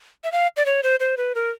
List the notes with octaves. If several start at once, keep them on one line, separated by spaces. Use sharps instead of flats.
E5
F5
D5
C#5
C5
C5
B4
A#4